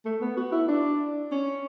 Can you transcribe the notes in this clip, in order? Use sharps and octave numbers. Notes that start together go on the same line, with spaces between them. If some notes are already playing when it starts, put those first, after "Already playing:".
A3
B3
F#4
E4
D4
C#4